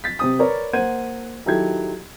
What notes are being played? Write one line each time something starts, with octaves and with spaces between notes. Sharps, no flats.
A6 B6
C3 C4 D#6
A#4 B4 C#5 D5
A#3 C5 F#5 G#6 D#7
D#3 F#3 E4 G4 A4 G#6